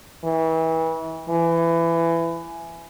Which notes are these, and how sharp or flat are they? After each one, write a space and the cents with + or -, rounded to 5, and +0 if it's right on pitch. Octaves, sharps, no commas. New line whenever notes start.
E3 -30
E3 +20